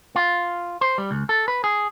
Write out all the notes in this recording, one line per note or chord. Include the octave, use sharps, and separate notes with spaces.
F4
C5
G3
C#2
A4
B4
G#4